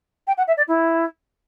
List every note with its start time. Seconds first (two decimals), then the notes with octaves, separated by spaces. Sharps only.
0.27 G5
0.38 F#5
0.48 E5
0.57 D5
0.68 E4